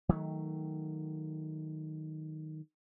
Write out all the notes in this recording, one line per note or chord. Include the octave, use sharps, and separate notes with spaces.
D#3 F#3 G#3 A3